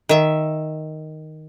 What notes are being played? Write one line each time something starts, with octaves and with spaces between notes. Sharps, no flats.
D#3 E5